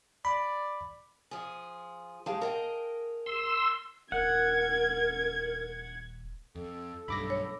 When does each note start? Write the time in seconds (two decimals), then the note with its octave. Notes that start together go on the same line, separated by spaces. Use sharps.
0.25 D5 B5
1.31 F3 G#4
2.26 G#3 G4 G#4 F5 A5
2.41 A#4 D#5 G5
3.26 C6 E6
4.12 D#1 A#4 F#5 G#6
6.55 F2 A4
7.08 B1 G2 B5 D6 A#6
7.30 C#5